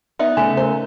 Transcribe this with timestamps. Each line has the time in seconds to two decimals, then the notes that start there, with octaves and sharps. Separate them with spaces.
0.19 B3 D#4 D5 E5
0.37 C#3 A3 G#5
0.57 E4 A#4 C5